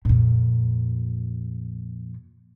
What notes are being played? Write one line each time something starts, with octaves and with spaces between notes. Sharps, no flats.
F2 A#2